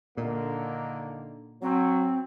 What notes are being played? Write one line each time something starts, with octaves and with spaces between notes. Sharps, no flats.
A#2 D3 D#3 A#3
F#3 C4